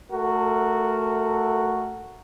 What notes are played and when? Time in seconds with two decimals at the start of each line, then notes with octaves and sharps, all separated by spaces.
0.11 A3 F#4 A4 A#4